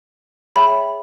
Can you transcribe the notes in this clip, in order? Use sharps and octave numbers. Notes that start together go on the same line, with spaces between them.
G#4 C#5 E5 G5 B5